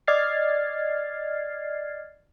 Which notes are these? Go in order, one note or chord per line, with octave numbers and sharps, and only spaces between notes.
D5 D#5 F6 G#6 A6 C7